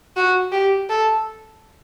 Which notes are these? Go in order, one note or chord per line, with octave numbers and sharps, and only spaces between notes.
F#4
G4
A4